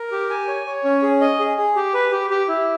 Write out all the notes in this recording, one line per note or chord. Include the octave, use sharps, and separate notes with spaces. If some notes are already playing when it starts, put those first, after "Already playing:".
Already playing: A#4
G4
G#5
C#5
C#5
C#4
G#4
D#5
G#4
G#4
G4
B4
G4
G4
E4